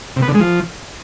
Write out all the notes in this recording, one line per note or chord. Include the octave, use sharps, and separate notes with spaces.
C3
B3
D3
G#3
F3